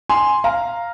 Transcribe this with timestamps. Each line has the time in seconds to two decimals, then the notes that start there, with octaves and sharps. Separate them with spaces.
0.09 G#5 C6
0.44 F5 A#5